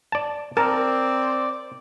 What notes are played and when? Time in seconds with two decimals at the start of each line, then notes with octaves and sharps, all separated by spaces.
0.12 D5 A5
0.57 C4 A#4 C5 D5 A5